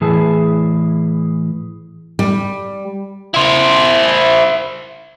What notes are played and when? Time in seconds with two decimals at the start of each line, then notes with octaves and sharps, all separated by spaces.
0.01 A2 E3 E4 G#4 A5
2.19 G3
3.34 E4 C5